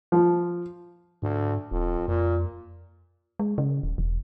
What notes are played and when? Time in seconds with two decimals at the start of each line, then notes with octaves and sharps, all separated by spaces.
0.12 F3
1.22 D2 G#2
1.71 D#1 F2
2.08 F2 A#2
3.40 G#3
3.58 C#3
3.83 D#1
3.98 E1